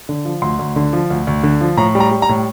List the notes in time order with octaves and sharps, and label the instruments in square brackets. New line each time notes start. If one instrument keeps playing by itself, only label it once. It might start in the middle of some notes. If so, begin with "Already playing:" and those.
[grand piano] D3
F3
D2 C6
D2
D3
F3
D2
D2
D3
F3
A2 A#5
G3
A#5
G3
A#5
A2